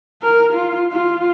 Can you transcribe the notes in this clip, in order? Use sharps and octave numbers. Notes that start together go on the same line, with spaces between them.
A#4
F4
F4